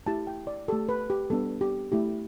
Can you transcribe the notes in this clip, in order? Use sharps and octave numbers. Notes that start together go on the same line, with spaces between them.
A3 E4 G4 A5
G5
D5
A3 G4 A4
B4
G4
G3 B3 D4 A4
G4
A3 E4 G4